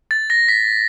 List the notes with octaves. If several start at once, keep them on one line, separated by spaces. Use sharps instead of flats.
A6
A#6
B6